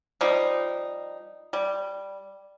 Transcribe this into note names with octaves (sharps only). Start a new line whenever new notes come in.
F3 G3 D#4
G3